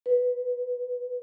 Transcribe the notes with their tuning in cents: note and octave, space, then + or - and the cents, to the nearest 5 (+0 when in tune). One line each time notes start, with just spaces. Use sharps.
B4 +0